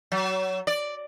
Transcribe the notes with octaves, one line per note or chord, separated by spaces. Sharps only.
F#3
D5